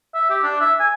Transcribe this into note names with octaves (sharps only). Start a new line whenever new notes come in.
E5
G4
D4
E5
G#5